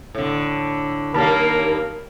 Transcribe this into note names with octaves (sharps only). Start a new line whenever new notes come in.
A2 D3
D#2 G3 A#3 A#4 A5 B5